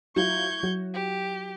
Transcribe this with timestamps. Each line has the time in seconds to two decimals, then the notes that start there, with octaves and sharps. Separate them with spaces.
0.16 F#3 E4 F4 C#6 G6 G#6
0.63 F#3 F#4
0.94 G4